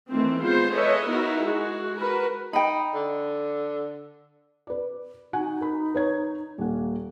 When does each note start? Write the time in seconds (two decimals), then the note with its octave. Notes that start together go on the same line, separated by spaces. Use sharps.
0.11 D#3 E3 A3 C4
0.42 G#3 B3 F4 C5
0.73 G#4 A4 B4 C#5 D#5 E5
1.07 B3 D#4 E4 F#4 A#4
1.43 G#3 F#4 G#4
1.98 F#4 A#4 B4
2.53 D#4 G5 B5
2.94 D3
4.67 B4 D5
5.33 D#4 F#4 F#5 G#5
5.61 A#4 B5
5.94 B4 C#5 G#6
6.58 D#1 A#3 F#5